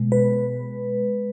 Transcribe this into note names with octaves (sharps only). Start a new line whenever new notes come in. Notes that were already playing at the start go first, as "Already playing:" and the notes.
Already playing: B2 G#3
B4